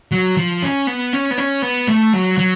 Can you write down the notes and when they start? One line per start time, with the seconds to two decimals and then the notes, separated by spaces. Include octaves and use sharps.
0.12 F#3
0.37 F3
0.62 C#4
0.87 B3
1.13 C#4
1.31 B3
1.38 C#4
1.62 B3
1.88 A3
2.13 F#3
2.38 F#3